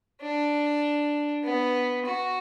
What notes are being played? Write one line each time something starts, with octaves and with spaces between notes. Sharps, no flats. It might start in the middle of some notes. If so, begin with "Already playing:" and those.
D4
B3
F#4